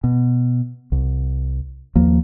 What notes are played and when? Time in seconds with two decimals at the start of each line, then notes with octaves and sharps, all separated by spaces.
0.04 B2
0.92 C2
1.96 D#2 F3 A#3